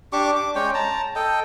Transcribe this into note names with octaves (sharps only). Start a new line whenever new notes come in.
D4 G4 C#6 D6
D6
G#3 C#4 C#5 G5
A5 A#5
A4 D#5 G5